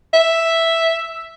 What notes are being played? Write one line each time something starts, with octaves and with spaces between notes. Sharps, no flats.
E5